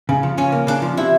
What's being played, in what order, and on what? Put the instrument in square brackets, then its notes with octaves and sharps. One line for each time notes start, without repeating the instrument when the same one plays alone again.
[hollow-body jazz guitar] C#3
F3
[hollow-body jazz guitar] C#3 [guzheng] C#4
[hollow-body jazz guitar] A#3
[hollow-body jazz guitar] C#3 [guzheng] D4
[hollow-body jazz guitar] F3
[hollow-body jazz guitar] C3 [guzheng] E4